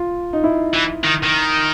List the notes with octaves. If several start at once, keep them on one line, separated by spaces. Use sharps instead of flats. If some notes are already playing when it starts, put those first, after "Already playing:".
Already playing: F4
D#4
E4
E3
D#3
D#3